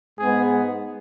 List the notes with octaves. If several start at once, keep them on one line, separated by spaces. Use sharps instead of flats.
G#2 G#3 B3 G#4